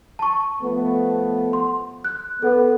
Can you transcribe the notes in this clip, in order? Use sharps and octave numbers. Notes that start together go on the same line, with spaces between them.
A5 C#6
F3 A3 B3
C6
F#6
B3 A4